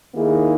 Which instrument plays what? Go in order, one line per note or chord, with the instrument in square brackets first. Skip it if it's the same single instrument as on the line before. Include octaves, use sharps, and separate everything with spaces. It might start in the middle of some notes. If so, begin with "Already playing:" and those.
[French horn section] D#2 D#3 A#3 E4 G#4